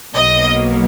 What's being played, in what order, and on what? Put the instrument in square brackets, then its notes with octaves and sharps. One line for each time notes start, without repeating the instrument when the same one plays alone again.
[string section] B1 B2 F#3 A#3 D#5